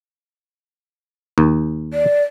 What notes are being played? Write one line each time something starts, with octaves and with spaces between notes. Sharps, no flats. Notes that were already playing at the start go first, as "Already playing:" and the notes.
D#2
D5